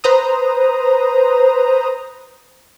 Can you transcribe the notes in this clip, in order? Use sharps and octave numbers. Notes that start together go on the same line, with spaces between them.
B4 C5 A#5 D#6